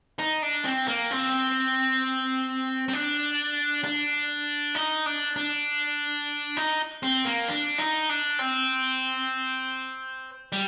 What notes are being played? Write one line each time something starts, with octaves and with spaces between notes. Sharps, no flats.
D#4
D4
C4
A#3
C4
C4
D4
D4
D#4
D4
D4
D#4
C4
A#3
D4
D#4
D4
C4
G3